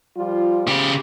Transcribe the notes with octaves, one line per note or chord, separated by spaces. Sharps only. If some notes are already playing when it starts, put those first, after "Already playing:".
F3 G3 F4
C#3 G4